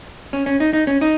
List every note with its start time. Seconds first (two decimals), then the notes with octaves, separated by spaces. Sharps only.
0.33 C#4
0.46 C#4
0.60 D#4
0.73 D#4
0.87 C#4
1.01 D#4